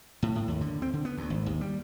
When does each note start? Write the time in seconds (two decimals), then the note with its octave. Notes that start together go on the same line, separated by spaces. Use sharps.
0.23 A2
0.35 A2
0.48 D#2
0.61 D3
0.82 C4
0.93 D3
1.05 B3
1.18 D2
1.30 G#1
1.46 D#2
1.61 G3